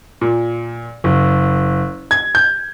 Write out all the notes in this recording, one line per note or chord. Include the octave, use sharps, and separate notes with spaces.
A#2
F#1
G#6
G6